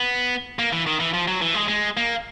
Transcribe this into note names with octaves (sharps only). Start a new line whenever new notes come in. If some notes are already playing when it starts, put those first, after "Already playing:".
Already playing: B3
A#3
E3
D#3
E3
F3
F#3
E3
G#3
G#3
A#3